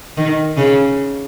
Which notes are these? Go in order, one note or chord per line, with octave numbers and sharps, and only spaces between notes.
D#3
C#3